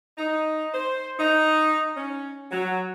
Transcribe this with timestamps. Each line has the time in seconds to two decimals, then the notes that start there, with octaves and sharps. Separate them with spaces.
0.18 D#4
0.73 C5
1.19 D#4
1.96 C#4
2.51 F#3